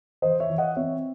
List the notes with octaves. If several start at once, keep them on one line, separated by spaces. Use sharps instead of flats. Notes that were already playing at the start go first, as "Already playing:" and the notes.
E3 C5 D#5
C#5 E5
E3
D#5 F#5
C4 C#5 E5